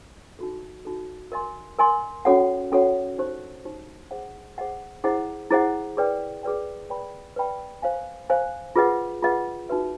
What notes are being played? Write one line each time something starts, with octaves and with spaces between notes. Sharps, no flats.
D#4 F#4 A4
D#4 F#4 A4
A#4 D#5 G#5 C6
A#4 D#5 G#5 C6
C#4 F#4 A4 C#5 F#5
C#4 F#4 A4 C#5 F#5
D#4 G4 C5
D#4 G4 C5
G#4 C5 D#5 F#5
G#4 C5 D#5 F#5
E4 G#4 C5 D#5 F#5
E4 G#4 C5 D#5 F#5
G#4 B4 D5 G5
G#4 B4 D5 G5
B4 D5 G5 B5
B4 D5 G5 B5
C5 F5 G#5
C5 F5 G#5
F4 G#4 B4 D#5 F#5
F4 G#4 B4 D#5 F#5
D#4 F#4 B4 E5